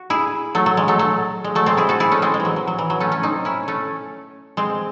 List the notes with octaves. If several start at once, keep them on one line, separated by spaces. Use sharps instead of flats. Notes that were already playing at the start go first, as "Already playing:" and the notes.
Already playing: F#4
E4 G#4
F#3 A3
F#3
G#3
F#3 A3
F#3 A3
G#3
F#3 A3
G#3 C4
E4 G#4
F#4 A4
E4 G#4
A3 C#4
G#3 C4
G#3
E3
F#3
F#3
F#3
E3
F#3
A3 C#4
A3 C#4
C4 D#4
C#4 E4
A3 C#4
G#3 C4